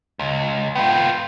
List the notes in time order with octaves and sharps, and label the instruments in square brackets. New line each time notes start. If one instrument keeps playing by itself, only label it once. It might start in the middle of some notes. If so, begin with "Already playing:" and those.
[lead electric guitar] C#2
[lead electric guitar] B3 F4 [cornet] G5